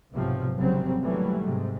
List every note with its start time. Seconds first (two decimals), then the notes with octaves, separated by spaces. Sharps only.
0.12 B1 G#2 C3 F3 F#3
0.58 G#1 C#3 F#3 G3 C4
1.02 D#2 E3 F#3 G3 A3
1.44 G#2 C3